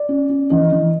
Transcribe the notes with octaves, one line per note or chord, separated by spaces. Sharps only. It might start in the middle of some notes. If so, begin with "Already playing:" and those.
Already playing: D5
C#4
C#4
E3 D#5
E3